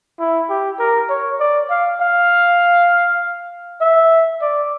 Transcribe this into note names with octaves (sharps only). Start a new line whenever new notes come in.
E4
G4
A#4
C#5
D5
F5
F5
E5
D5